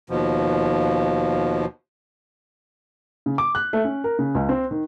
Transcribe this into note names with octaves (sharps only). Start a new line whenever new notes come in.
D#2 B2 F3
C#3
D6
F#6
A3
C#4
A#4
C#3
C#2
C4
D#3